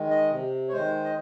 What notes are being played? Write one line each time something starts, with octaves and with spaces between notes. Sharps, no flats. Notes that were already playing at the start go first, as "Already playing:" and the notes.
Already playing: D#3 G#3
D#5
C3
C#5
D#3 G#3 C5
D#5